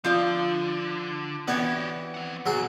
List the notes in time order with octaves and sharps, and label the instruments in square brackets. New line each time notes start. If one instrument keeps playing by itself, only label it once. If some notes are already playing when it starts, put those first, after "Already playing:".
[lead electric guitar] D3 [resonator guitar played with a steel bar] F3 F4 D5
[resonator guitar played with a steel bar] E3 C#5 D5 [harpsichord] B3 [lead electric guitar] F#4 G4
[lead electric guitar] C4 F#5
[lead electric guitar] B1 [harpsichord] F#3 G#4